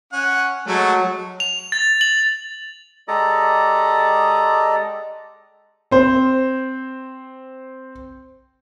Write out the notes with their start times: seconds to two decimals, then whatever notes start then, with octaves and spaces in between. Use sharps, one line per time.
0.13 C#4 F#5
0.67 F#3 G#3 A3 F#4
1.40 F7
1.72 A6
2.01 F#7
3.08 G#3 G4 A4 D5 D#5 A#5
5.91 C4 C5